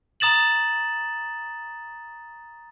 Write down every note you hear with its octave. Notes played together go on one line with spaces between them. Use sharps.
A#5 D#6 A6 E7 F#7